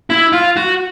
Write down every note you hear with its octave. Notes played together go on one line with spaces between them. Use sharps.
E4
F4
F#4